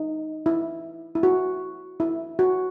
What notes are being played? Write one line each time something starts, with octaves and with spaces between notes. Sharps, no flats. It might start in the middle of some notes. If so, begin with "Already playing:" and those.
Already playing: D#4
E4
E4
F#4
E4
F#4